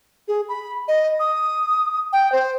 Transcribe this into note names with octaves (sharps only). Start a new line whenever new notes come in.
G#4
B5
D#5
D#6
G5
C5